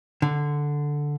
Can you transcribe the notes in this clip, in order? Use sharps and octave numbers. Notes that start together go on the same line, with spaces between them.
D3